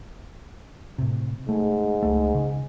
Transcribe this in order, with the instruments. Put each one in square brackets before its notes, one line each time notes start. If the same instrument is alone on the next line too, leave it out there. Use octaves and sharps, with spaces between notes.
[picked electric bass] A2 C3
[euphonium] G#2 [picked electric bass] A3
[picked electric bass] C#2 A3
C#3